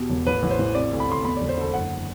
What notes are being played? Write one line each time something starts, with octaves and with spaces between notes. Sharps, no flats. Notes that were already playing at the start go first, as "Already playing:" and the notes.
Already playing: E2 B2 G4
E1
A1 B4
A1
C5
E3
C3 D5
D2
B5
D2 C6
E2 B5
E1 D5
C5
D3 A4
F#1 F#5